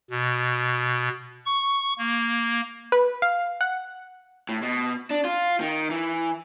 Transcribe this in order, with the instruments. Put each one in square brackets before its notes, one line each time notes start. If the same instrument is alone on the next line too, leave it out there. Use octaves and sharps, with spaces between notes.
[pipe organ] B2
C#6
A#3
[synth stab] B4
F5
F#5
[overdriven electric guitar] A2
B2
D4
F4
D#3
E3